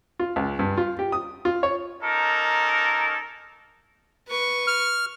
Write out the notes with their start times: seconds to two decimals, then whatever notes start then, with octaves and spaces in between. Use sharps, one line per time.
0.19 F4
0.36 C#2
0.59 G2
0.77 F4
0.99 G4
1.12 D#6
1.45 F4
1.63 C#5
2.02 A#3 C#4 D#4 A4 A#4
4.28 B4 C#6
4.67 F6